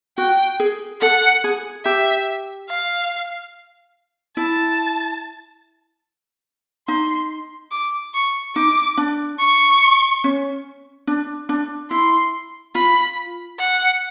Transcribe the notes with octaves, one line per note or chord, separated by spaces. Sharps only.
F#4 G5
G#4
A4 F#5
G#4
G4 E5
F5
E4 A5
D#4 C6
D6
C#6
D#4 D6
D4
C#6
C#4
D4
D4
E4 C6
F4 B5
F#5